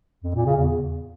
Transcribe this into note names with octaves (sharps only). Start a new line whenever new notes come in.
F2
A#2
C#3
E2